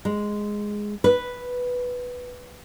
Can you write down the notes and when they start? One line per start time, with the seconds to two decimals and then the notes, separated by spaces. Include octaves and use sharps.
0.05 G#3
1.04 B4